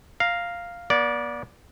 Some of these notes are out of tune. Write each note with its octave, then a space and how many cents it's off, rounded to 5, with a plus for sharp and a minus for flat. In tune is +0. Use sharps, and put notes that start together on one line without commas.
F5 +0 A#5 +0
B3 -45 D5 -15